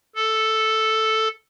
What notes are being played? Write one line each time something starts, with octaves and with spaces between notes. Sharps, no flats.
A4